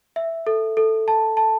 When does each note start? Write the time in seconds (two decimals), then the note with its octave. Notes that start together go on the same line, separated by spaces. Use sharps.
0.16 E5
0.47 A4
0.77 A4
1.08 A5
1.37 A5